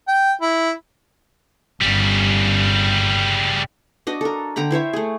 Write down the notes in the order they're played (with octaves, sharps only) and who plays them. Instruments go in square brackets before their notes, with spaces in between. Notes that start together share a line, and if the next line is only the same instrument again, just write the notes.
[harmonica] G5
E4
[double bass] G1 [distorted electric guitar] C#3 G3
[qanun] D4 F#4 D#5
A4 A#4
D3 G5 A#5 B5
E4 C5 C#5 E5
A3 G#4